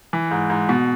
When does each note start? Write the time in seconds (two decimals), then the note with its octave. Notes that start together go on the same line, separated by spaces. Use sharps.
0.13 E3
0.31 G#2
0.50 G#2
0.69 B2